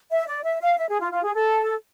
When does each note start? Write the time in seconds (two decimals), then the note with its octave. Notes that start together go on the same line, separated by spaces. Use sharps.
0.11 E5
0.27 D5
0.44 E5
0.61 F5
0.78 E5
0.89 G#4
1.00 F4
1.13 F4
1.24 G#4
1.34 A4